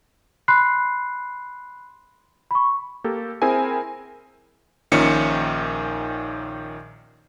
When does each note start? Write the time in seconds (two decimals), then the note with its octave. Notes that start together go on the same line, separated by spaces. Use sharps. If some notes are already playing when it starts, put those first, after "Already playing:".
0.48 B5 C6 F#6 C7
2.51 B5 C#6
3.04 A#3 G4 A4
3.42 C4 E4 G#4 A#4 G#5
4.92 A#1 A#2 D#3 C#4 C#7